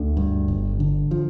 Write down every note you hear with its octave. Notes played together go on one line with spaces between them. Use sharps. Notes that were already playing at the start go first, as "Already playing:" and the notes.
Already playing: D2 D3
G2
G1
D3
F3